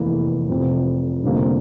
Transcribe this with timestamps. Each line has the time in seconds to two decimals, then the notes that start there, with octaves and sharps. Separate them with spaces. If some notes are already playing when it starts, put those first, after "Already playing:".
Already playing: F1 E2 E3 A#3
0.49 F1 F2 C3
1.23 F1 F2 D3 G3 A#3